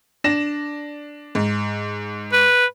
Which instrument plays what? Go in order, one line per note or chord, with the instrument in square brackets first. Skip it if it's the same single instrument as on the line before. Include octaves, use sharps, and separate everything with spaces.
[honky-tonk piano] D4 A#6 E7
G#2
[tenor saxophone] B4